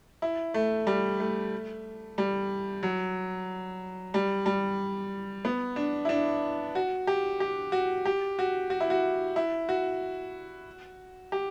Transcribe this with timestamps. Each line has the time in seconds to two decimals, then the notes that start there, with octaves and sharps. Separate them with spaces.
0.22 E4
0.54 A3
0.87 G3
1.20 A3
2.18 G3
2.83 F#3
4.14 G3
4.46 G3
5.45 B3
5.76 D4
6.05 E4
6.09 D4
6.75 F#4
7.07 G4
7.40 G4
7.72 F#4
8.05 G4
8.39 F#4
8.70 F#4
8.80 E4
8.90 F#4
9.36 E4
9.69 F#4
11.32 G4